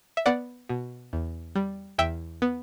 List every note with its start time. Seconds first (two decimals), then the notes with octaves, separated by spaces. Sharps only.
0.17 E5
0.26 B3 D5 F#5
0.69 B2
1.13 E2
1.56 G3
1.98 E2 E5 G5
2.42 B3